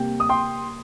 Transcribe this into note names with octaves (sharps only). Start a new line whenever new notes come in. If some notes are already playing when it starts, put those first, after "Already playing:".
Already playing: C3 G3 A#3 G5
D#6
G5 C6